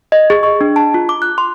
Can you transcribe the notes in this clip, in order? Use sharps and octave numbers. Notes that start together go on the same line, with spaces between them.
D#5
G#4
C#6
D4
A5
F4
D6
F#6
C6